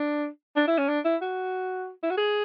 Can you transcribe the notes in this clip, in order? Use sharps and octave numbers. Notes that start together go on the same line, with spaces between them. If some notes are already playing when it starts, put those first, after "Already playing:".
Already playing: D4
D4
E4
C#4
D4
E4
F#4
E4
F#4
G#4